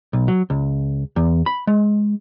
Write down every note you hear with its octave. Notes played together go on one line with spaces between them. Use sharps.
B1
F#3
C#2
E2
B5
G#3